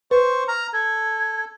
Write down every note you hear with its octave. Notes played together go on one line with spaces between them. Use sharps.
B4 C5 C#6
A#5 F6
A4 G#6